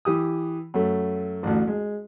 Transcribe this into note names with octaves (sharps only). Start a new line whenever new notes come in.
E3 G4 D#6
F#2 A3
A1 D2
G#3